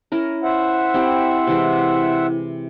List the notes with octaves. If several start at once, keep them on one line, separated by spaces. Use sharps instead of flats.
C#4 E4 A#4
C5 E5 F#5
C4 E4 G4
C3 E3 G#3